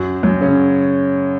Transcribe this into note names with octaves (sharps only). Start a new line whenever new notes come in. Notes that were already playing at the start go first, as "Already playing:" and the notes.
Already playing: F#2 F#3
F#2 F#3
C#3 C#4